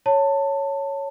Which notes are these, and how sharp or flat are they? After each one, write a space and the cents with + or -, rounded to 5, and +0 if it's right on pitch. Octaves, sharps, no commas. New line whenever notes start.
C#5 +0 A5 +20